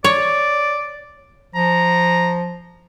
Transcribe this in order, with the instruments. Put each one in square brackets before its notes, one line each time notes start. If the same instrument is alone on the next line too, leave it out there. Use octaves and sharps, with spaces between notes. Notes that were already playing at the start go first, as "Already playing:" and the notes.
[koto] C#5 [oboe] D5
[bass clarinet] F3 [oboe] A#5